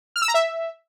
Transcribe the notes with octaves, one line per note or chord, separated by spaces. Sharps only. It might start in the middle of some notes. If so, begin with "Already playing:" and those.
F6
E6
A#5
E5